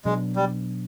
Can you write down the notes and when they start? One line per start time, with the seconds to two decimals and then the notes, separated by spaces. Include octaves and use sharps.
0.05 B2 F#3 G#3 B3 D4
0.36 G3